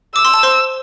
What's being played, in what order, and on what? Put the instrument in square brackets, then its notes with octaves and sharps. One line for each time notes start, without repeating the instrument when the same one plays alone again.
[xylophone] D6 [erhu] E6
[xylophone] C6
A5
C5 C6